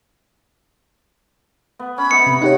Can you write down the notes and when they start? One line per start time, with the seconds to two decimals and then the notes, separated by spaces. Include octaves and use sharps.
1.79 B3
1.98 C#4 B5
2.11 B3 D#4 E5 C#7
2.27 C3
2.41 B2 D#3 D#4 G4 C#5 F#5